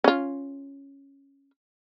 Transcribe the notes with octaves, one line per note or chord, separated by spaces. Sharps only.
C#4 F4